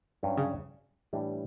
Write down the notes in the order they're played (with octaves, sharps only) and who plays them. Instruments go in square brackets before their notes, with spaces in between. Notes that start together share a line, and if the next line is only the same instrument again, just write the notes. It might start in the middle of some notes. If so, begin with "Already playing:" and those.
[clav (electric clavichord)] G2 F#3 C#4
[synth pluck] C#3
[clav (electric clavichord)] A2 E3 G3 D4